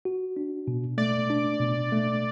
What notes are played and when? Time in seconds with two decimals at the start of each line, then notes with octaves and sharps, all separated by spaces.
0.05 F#4
0.37 D4
0.68 B2
0.98 A3 D5
1.30 D4
1.60 B2
1.92 A3